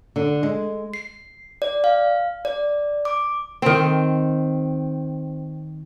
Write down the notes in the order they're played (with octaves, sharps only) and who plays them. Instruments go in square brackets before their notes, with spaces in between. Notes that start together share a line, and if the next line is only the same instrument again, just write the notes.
[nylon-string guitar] D3
G#3
[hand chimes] C7
D5
F5
D5
D6
[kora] D#3 C4